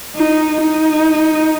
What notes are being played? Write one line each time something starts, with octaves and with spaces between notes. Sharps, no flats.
D#4
D#4